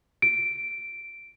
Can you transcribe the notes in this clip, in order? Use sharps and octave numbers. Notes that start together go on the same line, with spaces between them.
D7